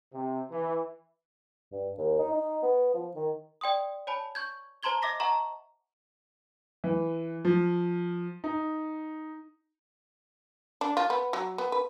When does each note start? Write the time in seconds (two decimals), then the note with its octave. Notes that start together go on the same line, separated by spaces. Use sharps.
0.13 C3
0.51 E3
1.72 G2
1.98 D#2
2.19 D#4
2.32 D#4
2.63 B3
2.94 F3
3.16 D#3
3.61 D5 G5 C6 D#6
4.07 C#5 G#5 A5 B5
4.35 C#6 G6 G#6
4.83 C5 A5 A#5 C6 G#6 G7
5.02 D#5 E5 D6 A#6 B6
5.20 D#5 E5 F#5 A5 A#5 C#6
6.84 E3
7.45 F3
8.44 D#4
10.81 D4
10.97 F4
11.10 B3
11.33 F#3
11.58 B3
11.72 B4